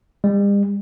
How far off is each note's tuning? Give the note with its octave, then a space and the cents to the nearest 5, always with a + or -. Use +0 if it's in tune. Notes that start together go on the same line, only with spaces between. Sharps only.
G3 +45